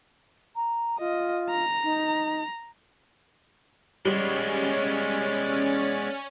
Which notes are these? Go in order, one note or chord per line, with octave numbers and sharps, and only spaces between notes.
A#5
F4 D#5
A#5
D#4
G3 G#3 B3 C#4 C#5 D5